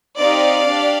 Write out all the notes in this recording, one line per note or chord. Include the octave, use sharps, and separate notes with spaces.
C4 D#4 G4 D5 F5
D4 G4